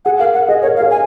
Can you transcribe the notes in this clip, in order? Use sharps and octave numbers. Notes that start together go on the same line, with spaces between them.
G#4 F#5
A#4 F5
F#5
G#4 D#5
A#4 C#5
F5
G#4
G#5